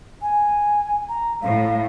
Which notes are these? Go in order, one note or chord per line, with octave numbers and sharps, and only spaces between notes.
G#5
A#5
A2 F5